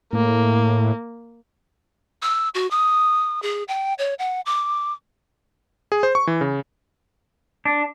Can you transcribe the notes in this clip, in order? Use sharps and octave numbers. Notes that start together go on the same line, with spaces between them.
A2 A#3
E6
F#4
D#6
G#4
G5
C#5
F#5
D6
G#4
C5
C#6
E3
C#3
D4